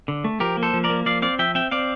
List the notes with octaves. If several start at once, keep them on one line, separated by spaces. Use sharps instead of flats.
D3
A3
F3 G4 A#4
A#3
A4 C5
F3
A#4 D5
A#3
F3 D5 F5
C4 D5 F5
F3 E5 G5
C4 E5 G5
C4 D5 F5